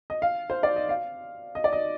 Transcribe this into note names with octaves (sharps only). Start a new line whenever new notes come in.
D#5
F5
C5
D5
D#5
F5
D#5
D5
D#5